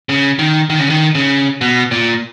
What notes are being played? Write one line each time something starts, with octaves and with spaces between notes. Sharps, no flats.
C#3
D#3
D#3
C#3
D#3
C#3
B2
A#2